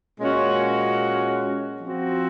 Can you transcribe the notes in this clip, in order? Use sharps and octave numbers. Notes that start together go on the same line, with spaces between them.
A#2 G#3 C#4 F#4
F3 C4 F#4